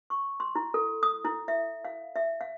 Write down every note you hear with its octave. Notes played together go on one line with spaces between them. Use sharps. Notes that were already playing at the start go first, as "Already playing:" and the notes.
C#6
C6
E4
A4
D#6
E4
E5
F5
E5
F5